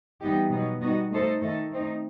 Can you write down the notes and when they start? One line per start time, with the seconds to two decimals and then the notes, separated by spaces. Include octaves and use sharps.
0.21 E3 G3 B3 D#4 G4
0.51 B2 F#3 B3 D#4
0.81 G3 B3 D#4 F#4
1.11 A3 D#4 A4 C5
1.41 D#3 A3 D#4 A4
1.71 A3 C4 D#4